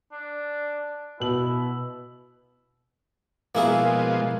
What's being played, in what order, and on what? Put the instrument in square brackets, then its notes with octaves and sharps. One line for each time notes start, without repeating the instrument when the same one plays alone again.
[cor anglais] D4
[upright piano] B2 F#7 [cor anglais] E4
[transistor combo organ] B2 F3 G#3 [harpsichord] A#3 E4 G#4